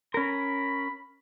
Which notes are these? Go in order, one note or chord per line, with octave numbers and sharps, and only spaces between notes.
C#4 A#4 B5